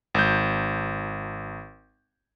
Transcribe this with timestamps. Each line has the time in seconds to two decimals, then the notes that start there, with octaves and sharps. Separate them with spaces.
0.14 G#1 G6